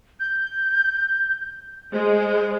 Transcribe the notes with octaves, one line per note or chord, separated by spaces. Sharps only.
G6
G#3 C5